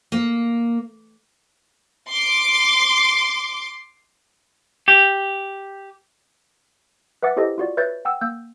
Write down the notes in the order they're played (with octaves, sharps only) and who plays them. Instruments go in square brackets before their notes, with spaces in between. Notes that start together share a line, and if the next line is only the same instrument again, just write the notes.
[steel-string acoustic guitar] A#3
[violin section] C6 D6
[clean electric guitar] G4
[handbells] B4 E5 F#5 D6 A6
E4 G4 A4 C5 D#5
F4 F#4 D5
B4 C#5 E5 G6 A6
F#5 G5 E6
A#3 E6 G6